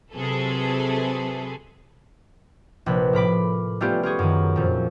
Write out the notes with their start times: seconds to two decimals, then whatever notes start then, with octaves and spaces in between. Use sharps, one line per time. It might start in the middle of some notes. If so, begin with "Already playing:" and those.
0.13 C3 F#3 G#4 A4 B4
2.86 A#1 C3 B4 F#6
3.13 A2 A#4 B5 D6
3.81 G3 A3 B3 C#4 F4 G4
4.03 F4 G4 G#4 C#6
4.19 F#2 D#3
4.56 F2 A#2